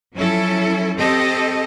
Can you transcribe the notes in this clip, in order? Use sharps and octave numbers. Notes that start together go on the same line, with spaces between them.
F3 F#3 C#4 E4 A4
C4 G4 A4 D#5